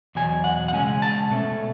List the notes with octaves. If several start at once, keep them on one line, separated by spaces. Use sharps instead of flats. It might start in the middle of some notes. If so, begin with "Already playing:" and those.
E2 B2 F#3 G#5
F#5
F#5
C#3 G#3 C#4 G#5
A5
B2 A3 C#4